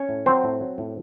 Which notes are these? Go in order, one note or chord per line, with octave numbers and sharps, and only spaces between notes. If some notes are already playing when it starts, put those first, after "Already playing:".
Already playing: C#4 C#5
A2
F#3 C4 C5
A2
F#3
A2